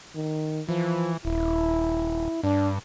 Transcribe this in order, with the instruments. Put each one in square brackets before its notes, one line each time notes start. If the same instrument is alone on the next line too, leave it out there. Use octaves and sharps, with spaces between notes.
[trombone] D#3
[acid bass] E3 [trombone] F3
[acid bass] D#1 [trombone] E4
[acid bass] G2 [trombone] D4